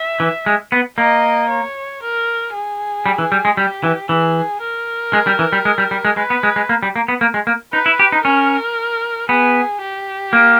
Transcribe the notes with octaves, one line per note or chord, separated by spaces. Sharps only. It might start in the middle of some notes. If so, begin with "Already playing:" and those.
Already playing: E5
E3
G#3
B3
A#3 D#5
C#5
A#4
G#4
G3
E3
G3
G#3
G3 G4
E3
E3 G#4
A#4
G#3
G3
E3
G3
G#3
G3
G3
G#3
G#3 B4
B3
G#3
G#3
A#3
G3
A#3
B3
A#3
G#3
A#3
D#4 B4
E4
G4
D#4
C#4 A#4
B3 G#4
G4
A#3